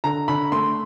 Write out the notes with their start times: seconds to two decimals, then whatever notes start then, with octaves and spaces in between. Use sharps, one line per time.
0.04 D3 A#5
0.28 D3 B5
0.52 A3 C6